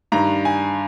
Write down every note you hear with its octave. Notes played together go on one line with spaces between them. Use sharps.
G2 D#3 A#5
G#5